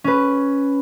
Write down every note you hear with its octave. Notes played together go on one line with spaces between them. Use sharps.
C#4 B4